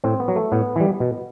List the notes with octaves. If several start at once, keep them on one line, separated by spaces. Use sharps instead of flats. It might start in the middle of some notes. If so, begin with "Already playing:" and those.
A2 C4
B3
F#3
A3
A2 B3
E3 G3
B2